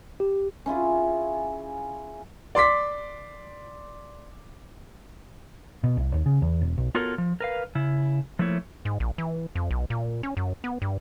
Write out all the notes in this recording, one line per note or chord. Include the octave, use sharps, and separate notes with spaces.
G4
C#4 E4 F4 G#4
D5 C6 D6 B6
B2
C2
D#2
C#3
E2
E1
B1
B3 F4 F#4 A4 A#4 C#5
F3
A#4 B4 F5
C#3 E4
F3 A3 A#3 E4 C#5
G#2
A#1
E3
F2
B1
A#2
C#4
F#2
B3
G2